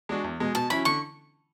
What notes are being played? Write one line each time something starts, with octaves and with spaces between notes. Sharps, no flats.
G#3 D4 F#4
E2
B2 G#3
B2 A5
F#3 C#4 E4 B5
D3 C#6